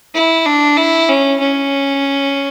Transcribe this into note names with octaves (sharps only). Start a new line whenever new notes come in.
E4
D4
E4
C#4
C#4